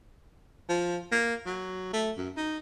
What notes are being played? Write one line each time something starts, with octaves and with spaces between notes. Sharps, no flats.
F3
A#3
F#3
A3
F#2
D#4